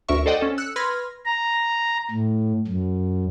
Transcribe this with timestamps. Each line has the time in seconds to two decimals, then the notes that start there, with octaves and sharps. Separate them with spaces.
0.09 D2 A#4 E5 C#6
0.26 A4 C5 D5 D#5 F#5 G5
0.41 C#4 A4
0.58 E6 F#6 C#7
0.76 B4 B5 C6 F6 G#6 A#6
1.26 A#5
2.11 A2
2.67 F#2